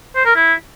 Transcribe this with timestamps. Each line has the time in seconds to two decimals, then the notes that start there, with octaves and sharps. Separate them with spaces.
0.15 C5
0.25 A#4
0.36 E4